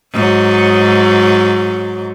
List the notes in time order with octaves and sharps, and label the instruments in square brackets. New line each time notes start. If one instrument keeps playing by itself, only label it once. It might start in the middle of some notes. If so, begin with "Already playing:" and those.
[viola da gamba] G#2 F#3